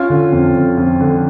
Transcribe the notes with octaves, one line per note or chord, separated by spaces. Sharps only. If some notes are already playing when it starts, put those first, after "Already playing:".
Already playing: C#4 F4
D3
F2
D3
F2
D3